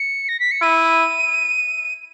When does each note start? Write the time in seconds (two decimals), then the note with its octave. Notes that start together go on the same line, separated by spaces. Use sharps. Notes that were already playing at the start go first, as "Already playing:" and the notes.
Already playing: C#7
0.29 A#6
0.40 B6
0.51 C#7
0.62 E4 D#7